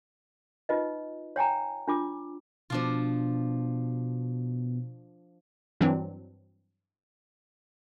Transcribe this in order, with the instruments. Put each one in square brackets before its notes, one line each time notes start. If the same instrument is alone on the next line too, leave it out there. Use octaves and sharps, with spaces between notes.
[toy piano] D#4 F4 B4 D#5
C#5 G5 G#5 A#5
D4 F4 D6
[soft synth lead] B2 [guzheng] F3 D4 F4
[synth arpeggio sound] G2 E3 F#3 C4 D4